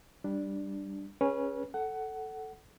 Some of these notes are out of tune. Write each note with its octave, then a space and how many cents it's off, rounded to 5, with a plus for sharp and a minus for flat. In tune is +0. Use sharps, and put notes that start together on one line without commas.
G3 +0 D4 +0
C#4 +0 G#4 -10 B4 -30
A4 +0 F#5 +20